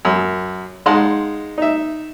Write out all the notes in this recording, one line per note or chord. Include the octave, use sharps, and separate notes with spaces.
F#2
G#3 D#4 F5 F#5 A5 C6
D#4 E5